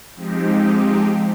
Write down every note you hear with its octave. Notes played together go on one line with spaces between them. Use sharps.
F3 G#3 C4 D#4 G4